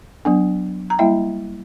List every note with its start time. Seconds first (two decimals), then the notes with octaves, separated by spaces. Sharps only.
0.25 F#3 B3 D4
0.90 A#5
0.99 G3 A#3 E4 E5 G5